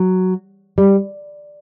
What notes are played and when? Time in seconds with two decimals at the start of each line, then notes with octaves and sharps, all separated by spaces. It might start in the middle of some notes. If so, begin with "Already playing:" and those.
Already playing: F#3
0.78 G3